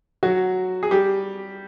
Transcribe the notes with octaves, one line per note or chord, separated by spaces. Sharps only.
F#3 F#4
G#4
G3 G4